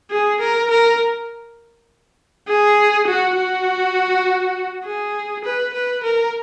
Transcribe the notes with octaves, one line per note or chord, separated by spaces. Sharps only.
G#4
A#4
A#4
G#4
F#4
F#4
G#4
B4
B4
A#4